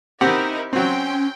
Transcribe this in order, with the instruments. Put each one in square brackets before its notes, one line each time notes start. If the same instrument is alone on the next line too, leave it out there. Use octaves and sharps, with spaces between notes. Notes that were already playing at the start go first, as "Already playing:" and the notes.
[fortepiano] C4 G4 F#5 [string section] D#4 E4 A#4
[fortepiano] F#3 C4 [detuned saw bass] C#4 [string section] G5 C6